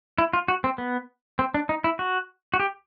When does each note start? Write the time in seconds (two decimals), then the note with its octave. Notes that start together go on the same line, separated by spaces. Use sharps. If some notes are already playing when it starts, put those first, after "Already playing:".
0.18 E4
0.33 F4
0.48 F#4
0.64 C4
0.78 B3
1.39 C4
1.54 D4
1.69 D#4
1.84 E4
1.99 F#4
2.54 F#4
2.60 G4